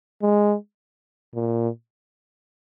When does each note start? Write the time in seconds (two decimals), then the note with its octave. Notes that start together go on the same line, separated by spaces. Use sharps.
0.22 G#3
1.35 A#2